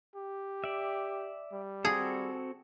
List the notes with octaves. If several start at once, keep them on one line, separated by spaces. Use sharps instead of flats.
G4
D5 E5
G3
C4 F#4 G#4 A4